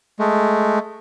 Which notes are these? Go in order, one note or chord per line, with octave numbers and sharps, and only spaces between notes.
G#3 A3